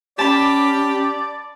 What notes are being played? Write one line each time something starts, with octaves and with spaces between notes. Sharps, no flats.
C#4 G4 D5 A5 B5